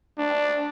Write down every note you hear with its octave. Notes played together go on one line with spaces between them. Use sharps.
D4